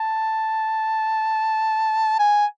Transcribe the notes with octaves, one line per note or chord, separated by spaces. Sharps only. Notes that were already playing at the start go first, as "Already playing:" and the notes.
Already playing: A5
G#5